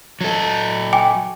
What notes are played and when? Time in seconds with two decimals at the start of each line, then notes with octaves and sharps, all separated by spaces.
0.21 F#3 A4
0.93 G5 G#5 D6